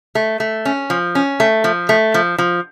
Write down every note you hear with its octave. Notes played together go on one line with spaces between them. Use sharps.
A3
A3
C#4
F3
C#4
A3
F3
A3
F3
F3